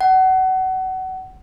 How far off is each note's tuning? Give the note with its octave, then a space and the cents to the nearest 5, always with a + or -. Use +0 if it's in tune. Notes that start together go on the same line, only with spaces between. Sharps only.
F#5 +25